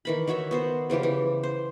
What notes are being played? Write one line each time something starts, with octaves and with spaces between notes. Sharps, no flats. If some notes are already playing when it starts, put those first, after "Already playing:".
D#3 E3 B5
D#3 F#4 C#5 E5
B3 F#4 C5
C#3 E3 F3 G4
E3
C5